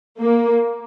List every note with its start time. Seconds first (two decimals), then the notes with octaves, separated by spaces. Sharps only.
0.20 A#3